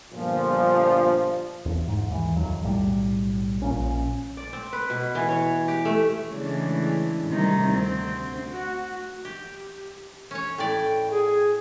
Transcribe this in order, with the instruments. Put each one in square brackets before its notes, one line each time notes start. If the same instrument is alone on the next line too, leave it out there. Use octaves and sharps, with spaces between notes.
[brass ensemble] G1 A#2 F3
[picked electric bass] E2
G#2
D#2 E3
F2 D#3 F#3
B1 A2 G3
A#1 A#2 C#4
[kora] D5
C4
B4
B2
E3
C#5
G4
A3
[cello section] C#3 E3 G#3 A3 D4
A2 C3 D#3 G3 D#4
D2 C4
F#4
[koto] G4
C#4 C#5
[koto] A2 D5 [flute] G5
[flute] G#4